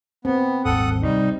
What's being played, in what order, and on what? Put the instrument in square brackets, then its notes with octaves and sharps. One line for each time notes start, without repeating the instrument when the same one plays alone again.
[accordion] B3 [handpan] C4
[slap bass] D#1 G#1 [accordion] A4 F#5 D#6
[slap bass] C2 [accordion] G3 D#4